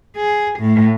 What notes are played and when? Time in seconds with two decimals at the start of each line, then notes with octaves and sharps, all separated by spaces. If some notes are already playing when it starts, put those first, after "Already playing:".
0.16 G#4
0.60 A2